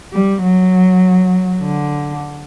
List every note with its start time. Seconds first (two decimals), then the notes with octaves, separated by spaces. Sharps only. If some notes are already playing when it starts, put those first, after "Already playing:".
0.13 G3
0.42 F#3
1.61 D3